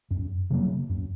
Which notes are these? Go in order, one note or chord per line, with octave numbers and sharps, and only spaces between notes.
F#2
C#3 F#3 A#3
F#2